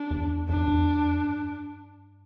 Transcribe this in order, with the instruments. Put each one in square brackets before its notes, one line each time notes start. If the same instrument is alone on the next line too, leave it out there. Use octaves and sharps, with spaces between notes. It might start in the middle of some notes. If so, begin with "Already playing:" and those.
Already playing: [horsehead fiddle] D4
[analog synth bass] E2
[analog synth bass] F2 [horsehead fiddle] D4
[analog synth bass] F2
E2
F2
G2